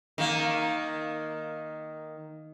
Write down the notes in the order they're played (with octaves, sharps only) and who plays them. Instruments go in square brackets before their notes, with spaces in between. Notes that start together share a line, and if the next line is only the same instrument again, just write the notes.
[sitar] D#3 A#3